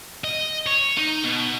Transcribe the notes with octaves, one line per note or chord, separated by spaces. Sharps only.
D#5
C#5
D#4
B2